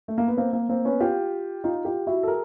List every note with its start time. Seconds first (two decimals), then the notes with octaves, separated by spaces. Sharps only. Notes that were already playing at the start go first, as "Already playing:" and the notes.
0.08 A3
0.18 A#3
0.28 B3
0.37 A#3 C4
0.53 A#3
0.69 A#3 C4
0.85 B3 C#4
1.00 F4 G4
1.64 D#4 F4
1.85 F4 G4
2.07 E4 F#4
2.23 A4
2.28 G#4 A#4